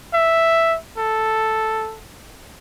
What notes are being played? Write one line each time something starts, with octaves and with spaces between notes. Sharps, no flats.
E5
A4